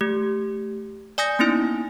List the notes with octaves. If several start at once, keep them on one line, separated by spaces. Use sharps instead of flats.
A3 G4
D5 G#5 D#6 G6 A#6
A#3 B3 C#4 D#4 E4 G#5